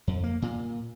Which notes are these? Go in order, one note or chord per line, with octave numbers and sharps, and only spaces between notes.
F2
A#3
A#2